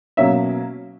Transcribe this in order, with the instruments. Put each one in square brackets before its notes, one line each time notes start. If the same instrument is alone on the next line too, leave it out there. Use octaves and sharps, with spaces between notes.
[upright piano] B2 F#3 A#3 C#4 E5